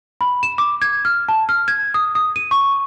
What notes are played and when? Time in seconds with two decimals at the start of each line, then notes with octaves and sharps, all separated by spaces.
0.21 B5
0.43 E7
0.58 D6
0.82 G#6
1.05 F6
1.29 A5
1.49 F6
1.68 G#6
1.94 D#6
2.15 D#6
2.36 D#7
2.51 C#6